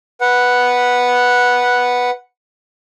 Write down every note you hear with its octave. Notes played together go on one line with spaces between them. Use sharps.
B4 F#5